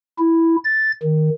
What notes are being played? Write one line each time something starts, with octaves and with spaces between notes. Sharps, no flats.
E4
A6
D#3